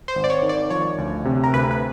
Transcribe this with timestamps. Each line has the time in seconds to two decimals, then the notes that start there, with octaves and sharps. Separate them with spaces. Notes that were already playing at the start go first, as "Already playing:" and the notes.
0.08 C5
0.16 G#1
0.24 D5
0.30 C#5
0.42 D#3
0.49 D5
0.70 F3 C#5
0.98 D2
1.25 C3
1.43 A#4
1.53 D2 B4
1.71 B4